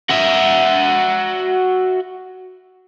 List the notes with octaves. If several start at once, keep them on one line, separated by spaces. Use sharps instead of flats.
F#4 E5